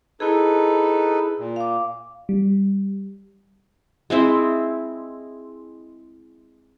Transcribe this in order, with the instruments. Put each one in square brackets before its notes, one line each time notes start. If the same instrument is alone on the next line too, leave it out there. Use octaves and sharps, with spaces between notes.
[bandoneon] D#4 A4 B4 [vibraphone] E4 G#4
[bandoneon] A#2
[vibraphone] F5 D6
[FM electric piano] G3
[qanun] G#3 C4 E4 C5